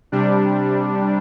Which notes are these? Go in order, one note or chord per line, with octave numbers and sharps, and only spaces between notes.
C3 G3 D4